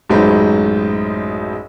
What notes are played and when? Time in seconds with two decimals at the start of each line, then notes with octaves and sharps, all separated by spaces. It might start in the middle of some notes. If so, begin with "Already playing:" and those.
0.09 A1 F#2 G#3 D#4 C5 B5